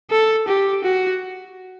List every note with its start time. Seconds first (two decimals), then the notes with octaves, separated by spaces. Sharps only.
0.11 A4
0.48 G4
0.84 F#4